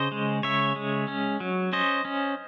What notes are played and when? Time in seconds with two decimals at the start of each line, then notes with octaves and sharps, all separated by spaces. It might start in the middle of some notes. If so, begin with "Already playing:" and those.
Already playing: C#3 C5 D#5
0.12 G#3
0.43 C#3 C#5 E5
0.76 G#3
1.08 C#4
1.40 F#3
1.73 C#4 C5 D#5
2.05 C#4